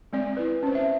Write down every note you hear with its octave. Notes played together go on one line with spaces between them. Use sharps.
G#3 C4 D5
E4 B4
C#4 C5
E5